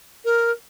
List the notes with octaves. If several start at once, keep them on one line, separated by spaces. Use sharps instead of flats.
A#4